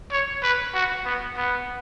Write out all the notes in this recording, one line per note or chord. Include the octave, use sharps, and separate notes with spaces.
C#5
B4
F#4
B3
B3